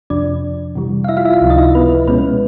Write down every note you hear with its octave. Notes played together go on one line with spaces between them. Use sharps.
F2 C3 F3 D4 D5
C3 E3 G3
F5
E4 E5
F4 F5
E4 E5
F4 F5
C#2 C3 F3
D#4 D#5
E4 E5
B3 B4
B2 G#3 B3 C#4 B4